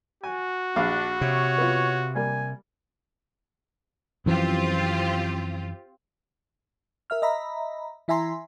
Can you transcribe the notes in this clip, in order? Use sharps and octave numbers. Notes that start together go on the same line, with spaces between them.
F#4 G#5
A#1 D4 F5 D6
C3 C#5
B3 F4
G3 A#3 G#5
F#2 E3 F3 C4 F4 G4
A#4 E5 F6
D#5 E5 A#5 B5
E3 E4 E5 G#5 A#5 C6